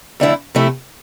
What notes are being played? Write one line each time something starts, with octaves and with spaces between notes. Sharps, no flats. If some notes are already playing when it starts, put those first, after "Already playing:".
F2 D3 A3 E4
C3 F3 A3 E4